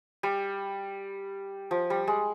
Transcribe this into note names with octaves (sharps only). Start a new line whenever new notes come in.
G3
F3
G3
G#3